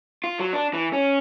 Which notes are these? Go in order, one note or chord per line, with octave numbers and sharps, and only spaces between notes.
F4
F#3
D4
E3
C#4